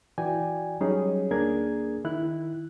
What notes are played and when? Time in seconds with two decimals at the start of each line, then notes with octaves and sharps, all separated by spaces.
0.18 E3 F#4 D5 G5 G#5
0.80 F#3 G3 C#4 D#4 G#4 C#5
1.31 D2 A#3 D4 G#4 A#4 G#6
2.04 D#3 E4 F#6